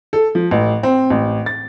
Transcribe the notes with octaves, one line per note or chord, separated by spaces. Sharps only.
A4
F3
A1
C4
A1
A6